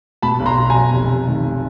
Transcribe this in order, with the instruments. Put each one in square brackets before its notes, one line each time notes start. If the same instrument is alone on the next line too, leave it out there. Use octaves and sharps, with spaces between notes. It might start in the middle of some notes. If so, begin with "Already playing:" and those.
[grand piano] B2 A5 B5
B1
A#5 C6
B1
G#5 A#5
B1
F1
F1
D#3